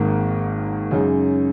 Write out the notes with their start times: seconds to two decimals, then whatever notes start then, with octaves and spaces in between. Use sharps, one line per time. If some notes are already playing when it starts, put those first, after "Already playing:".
Already playing: G#1 G#2 D#3 A#3
0.91 F#2 C#3 G#3 D#4